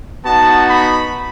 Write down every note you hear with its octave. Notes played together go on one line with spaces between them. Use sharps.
B3 D#4 F#4 A5
B5